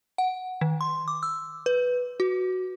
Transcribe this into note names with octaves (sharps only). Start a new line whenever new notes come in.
F#5
D#3
C6
D6
E6
B4
F#4